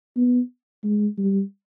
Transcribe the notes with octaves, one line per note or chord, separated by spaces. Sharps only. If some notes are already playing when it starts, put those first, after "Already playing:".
B3
G#3
G3